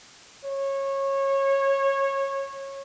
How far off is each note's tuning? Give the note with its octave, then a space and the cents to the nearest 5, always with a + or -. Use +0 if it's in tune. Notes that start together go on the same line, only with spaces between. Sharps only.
C#5 -20